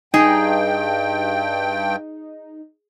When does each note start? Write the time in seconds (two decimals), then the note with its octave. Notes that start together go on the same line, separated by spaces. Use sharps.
0.14 G2 D#4 G#4 G5